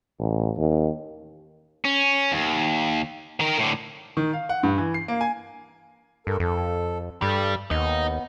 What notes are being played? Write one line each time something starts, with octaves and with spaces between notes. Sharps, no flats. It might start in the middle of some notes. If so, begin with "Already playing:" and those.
A1
D#2
C#4
D#2
D#3 A#4
A2 D3
D#3
F5
F#5
G2
E3
C7
A#3
G#5
G2 A4 A#4
F2 A4
G2 G3 A4 D5
D#2 B3 D#4